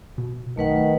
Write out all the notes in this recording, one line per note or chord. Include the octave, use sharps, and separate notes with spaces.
B2
B1 D#3 A3 B4 F#5